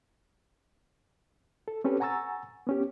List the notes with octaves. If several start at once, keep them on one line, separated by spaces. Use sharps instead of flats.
A4
C4 C#4 G4 A4 B4
F#5 G#5 A#5 C#6 E6 A6
B3 C#4 G4